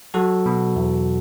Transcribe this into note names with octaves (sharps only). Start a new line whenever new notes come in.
F#3 F#4 A4
B2
E2